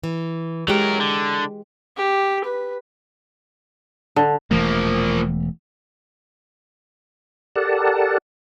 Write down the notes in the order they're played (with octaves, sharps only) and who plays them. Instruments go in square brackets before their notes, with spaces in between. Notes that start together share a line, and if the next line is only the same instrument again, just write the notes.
[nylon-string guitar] E3
[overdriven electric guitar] F#3 A#4 [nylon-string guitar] G#3 G4
[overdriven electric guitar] D3
[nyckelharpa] G4
B4
[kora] D3 [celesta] A5
[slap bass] E1 E3 A3 [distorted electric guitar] F3 A#3
[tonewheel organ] G4 A4 A#4 D5 F#5 A5